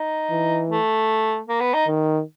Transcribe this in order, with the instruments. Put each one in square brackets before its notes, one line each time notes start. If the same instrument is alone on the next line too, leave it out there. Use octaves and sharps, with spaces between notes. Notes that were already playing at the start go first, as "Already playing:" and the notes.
Already playing: [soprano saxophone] D#4
[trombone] E3
[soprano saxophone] A3
A#3
B3
D#4
[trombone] D#3